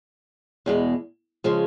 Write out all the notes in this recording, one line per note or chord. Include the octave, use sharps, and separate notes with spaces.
E2 B2 G#3
C#3 F3 G#3